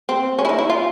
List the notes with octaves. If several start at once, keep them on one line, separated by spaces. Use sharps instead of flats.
C4
C#4
E4
D#4
E4
F4